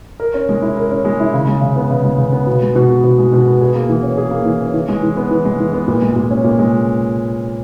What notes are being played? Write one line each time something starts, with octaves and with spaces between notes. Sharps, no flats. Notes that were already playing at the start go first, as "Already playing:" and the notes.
A#4
C#4
G#3
E4
A#4
C#4
G#3
E4
C#3
G#3
C#3
B3
C#3
G#3
C#3
B3
B2
G#3
B2
B3
B2
G#3
B2
B3
G#4
A#3
E3
C#4
G#4
A#3
E3
C#4
E3
G#3
E3
B3
E3
G#3
E3
B3
A#2
G#3
A#2
C#4
A#2
G#3